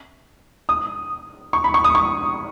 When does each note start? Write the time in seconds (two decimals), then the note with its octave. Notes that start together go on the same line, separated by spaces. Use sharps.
0.69 D#6
1.53 C#6
1.64 B5
1.74 C#6
1.84 D#6
1.95 C#6